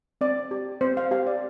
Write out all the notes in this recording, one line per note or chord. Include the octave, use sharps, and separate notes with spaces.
C4 D5
G4
C4 C5
F5
G4 F5
D5